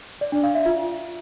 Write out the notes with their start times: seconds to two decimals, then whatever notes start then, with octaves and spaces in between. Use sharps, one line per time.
0.21 D5
0.32 D4
0.43 F5
0.55 E5
0.66 F4